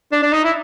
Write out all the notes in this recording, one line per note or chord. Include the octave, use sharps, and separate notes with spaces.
D4
D4
D#4
E4